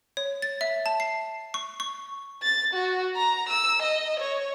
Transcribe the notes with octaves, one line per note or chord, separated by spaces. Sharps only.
C#5
A6
E5
A5
C7
C#6
C#6
A6
F#4
A#5
E6
D#5
C#5